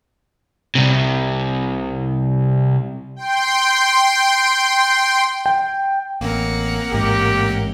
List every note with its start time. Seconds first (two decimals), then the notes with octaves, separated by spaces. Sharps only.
0.75 C2 C3
3.16 G5 C6
5.46 G5
6.21 A1 A#3 C4 A#4 F#5
6.93 A1 G#2 G4